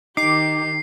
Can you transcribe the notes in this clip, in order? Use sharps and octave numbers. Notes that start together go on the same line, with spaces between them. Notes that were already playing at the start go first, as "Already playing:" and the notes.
D#3 D#4 G4 D6 C7